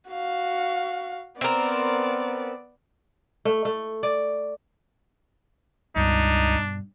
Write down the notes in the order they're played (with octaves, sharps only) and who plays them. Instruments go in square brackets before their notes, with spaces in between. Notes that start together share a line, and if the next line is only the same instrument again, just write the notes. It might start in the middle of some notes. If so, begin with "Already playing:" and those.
[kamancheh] F#4 F5
[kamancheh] B3 D5 [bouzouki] C4 A#4
[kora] A3
A3
D5
[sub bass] C#2 [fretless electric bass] G2 B2 [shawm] D4 [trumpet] D#4